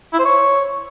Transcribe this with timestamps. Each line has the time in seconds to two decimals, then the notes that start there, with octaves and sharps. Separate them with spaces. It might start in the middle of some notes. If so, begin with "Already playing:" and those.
0.13 E4
0.19 C5
0.25 C#5